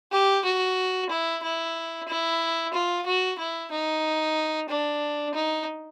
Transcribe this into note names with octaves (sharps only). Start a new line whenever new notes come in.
G4
F#4
E4
E4
E4
F4
F#4
E4
D#4
D4
D#4